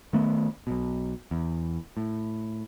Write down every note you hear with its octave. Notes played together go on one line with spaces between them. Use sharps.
D#3 A3 B3
B1 B2
E2
A2